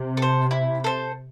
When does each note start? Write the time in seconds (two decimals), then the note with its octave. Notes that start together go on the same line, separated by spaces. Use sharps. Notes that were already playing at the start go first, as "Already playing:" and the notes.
Already playing: C3
0.17 A4 C5
0.51 E4
0.84 A4 C5